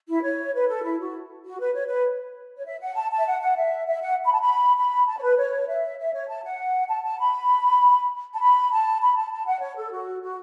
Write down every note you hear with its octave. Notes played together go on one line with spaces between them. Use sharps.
E4
C#5
B4
A4
E4
F#4
F#4
B4
C#5
B4
C#5
E5
F#5
A5
A5
E5
F#5
F#5
E5
E5
F#5
B5
A5
B5
B5
A5
C#5
B4
C#5
E5
E5
C#5
A5
F#5
A5
A5
B5
A5
B5
A5
B5
A5
A5
F#5
C#5
A4
F#4
F#4